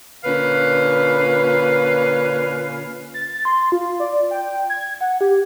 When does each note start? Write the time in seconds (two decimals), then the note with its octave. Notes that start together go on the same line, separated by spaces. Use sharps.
0.24 A#2 D3 C#4 B4 F5
3.14 A6
3.45 C6
3.72 F4
4.00 D5
4.31 G5
4.70 G#6
5.01 F#5
5.21 G4